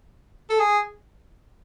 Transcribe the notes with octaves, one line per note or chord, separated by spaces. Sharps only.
A4
G#4